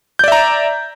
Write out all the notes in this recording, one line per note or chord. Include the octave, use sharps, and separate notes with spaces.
D5 E5 A#5 G6